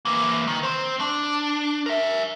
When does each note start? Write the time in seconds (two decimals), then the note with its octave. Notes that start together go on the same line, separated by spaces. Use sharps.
0.05 E3 A#3
0.48 D#3
0.63 C4 C5
1.01 D4
1.86 A#4 E5